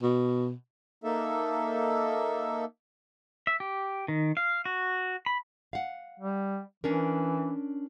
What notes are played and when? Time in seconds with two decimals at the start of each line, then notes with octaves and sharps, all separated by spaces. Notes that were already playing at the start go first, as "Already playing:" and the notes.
0.02 B2
1.04 A#3 D#4 A4 E5
3.47 E5
3.60 G4
4.08 D#3
4.37 F5
4.65 F#4
5.26 B5
5.73 F5 F#5
6.20 G3
6.84 E3 C#4 D4 A#4